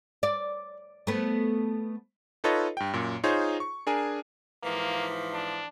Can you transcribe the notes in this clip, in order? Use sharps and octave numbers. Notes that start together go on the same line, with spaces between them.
D5
A3 B3
D#4 F4 A4 B4 C#5 D#5
G2 G5
F#2 A#2
D#4 F4 G#4 C5 C#5
C#6
D4 G#4 A#4 G#5
G#2 E3 F3 A#3
D4